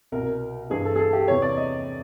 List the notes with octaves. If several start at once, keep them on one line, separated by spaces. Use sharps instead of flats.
C2 B2 A#4
G2 E3 G#4
A4
G#4
A4
G4
E2 C3 E3 C#5
D5
D#5